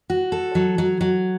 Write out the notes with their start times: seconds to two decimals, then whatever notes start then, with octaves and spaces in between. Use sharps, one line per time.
0.10 F#4
0.32 A4
0.55 F#3
0.78 F#3
1.01 F#3